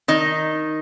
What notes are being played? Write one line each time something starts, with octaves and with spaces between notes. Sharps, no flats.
D#3 D#4